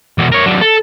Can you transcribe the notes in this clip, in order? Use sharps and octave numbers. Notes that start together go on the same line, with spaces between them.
E2 B2
A#4 C#5
F#3 D4
A4